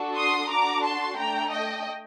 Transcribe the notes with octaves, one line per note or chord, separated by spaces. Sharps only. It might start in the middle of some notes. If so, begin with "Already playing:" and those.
Already playing: D4 F#4 A4
C6 D#6
D4 F#4 A4 A#5 D6
A5 C6
A3 D4 A4 G5 A#5
D#5 G5